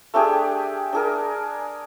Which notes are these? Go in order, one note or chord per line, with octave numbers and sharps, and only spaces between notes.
A3 D4 G4 G#4
D4 G#4 A#4